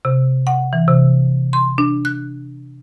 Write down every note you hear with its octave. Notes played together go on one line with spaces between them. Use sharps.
C3
F#5
E3
C3
C6
D4
F#6